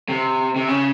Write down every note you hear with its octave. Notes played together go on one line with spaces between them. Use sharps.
C3
C3
C#3